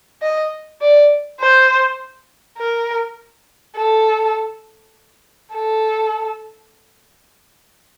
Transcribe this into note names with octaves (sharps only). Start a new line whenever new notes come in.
D#5
D5
C5
A#4
A4
A4